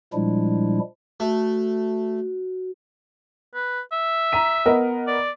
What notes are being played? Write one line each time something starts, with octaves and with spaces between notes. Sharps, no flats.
A#2 F3 G3 G#3 D4 E4
A3 F#4
B4
E5
A#5 B6 D#7
B3 A#4 D#5
D5